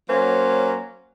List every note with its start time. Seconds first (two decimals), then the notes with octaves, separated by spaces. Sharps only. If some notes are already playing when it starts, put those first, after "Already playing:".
0.09 F#3 A#3 C#4 C5